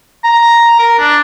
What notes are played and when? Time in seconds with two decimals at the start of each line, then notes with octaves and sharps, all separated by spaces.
0.24 A#5
0.79 A#4
0.99 D4